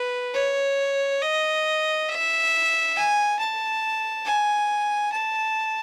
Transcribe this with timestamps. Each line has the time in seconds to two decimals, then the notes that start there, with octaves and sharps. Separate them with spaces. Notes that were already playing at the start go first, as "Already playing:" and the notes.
Already playing: B4
0.34 C#5
1.22 D#5
2.09 E5
2.95 G#5
3.39 A5
4.25 G#5
5.12 A5